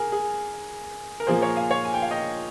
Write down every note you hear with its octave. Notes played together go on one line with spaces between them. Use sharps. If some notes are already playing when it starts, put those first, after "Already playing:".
Already playing: G#4 A#4
G#4
A#4
A#2 F3 A#3 G#4 C5
A#4 C#5
F5 G#5
C#5 F5
G#5
G5
F5
D#5 G5